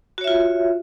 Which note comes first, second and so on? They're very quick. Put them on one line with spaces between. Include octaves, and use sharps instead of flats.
F#4 C#5 E5 F4